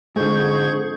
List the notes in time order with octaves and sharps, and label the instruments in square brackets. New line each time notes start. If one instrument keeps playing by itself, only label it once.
[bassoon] F2 [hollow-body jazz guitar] G#2 D3 [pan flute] G#4 [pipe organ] C#6 G6 G#6